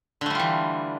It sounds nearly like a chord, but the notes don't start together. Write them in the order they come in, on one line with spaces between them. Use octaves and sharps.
D3 A3 G3 F4 E3